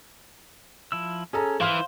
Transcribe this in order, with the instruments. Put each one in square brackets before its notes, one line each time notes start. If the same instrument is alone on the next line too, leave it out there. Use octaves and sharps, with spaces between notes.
[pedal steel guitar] F3 E4 E6
[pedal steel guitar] C#4 [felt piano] G#4 A4 A#5
[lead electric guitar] E3 [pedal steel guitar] C5 [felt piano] F5 C6 F6